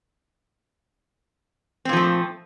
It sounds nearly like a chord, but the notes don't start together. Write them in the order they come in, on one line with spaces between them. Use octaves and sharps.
C4 A#2 F3 A3